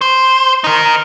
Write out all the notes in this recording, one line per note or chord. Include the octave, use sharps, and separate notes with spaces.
C5
D#4 A#4